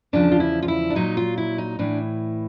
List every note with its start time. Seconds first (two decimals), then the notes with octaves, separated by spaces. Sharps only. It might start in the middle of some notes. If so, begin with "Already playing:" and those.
0.13 E2 C#3 F3 D4
0.31 F4
0.40 E4
0.62 F4
0.68 E4
0.90 D4
0.95 A#2 F#3 D#4
1.17 F4
1.38 E4
1.58 D#4
1.79 A2 E3 D4